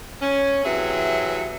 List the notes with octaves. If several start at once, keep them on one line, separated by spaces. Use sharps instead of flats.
C#4
C3 E3 F#3 G#4 E5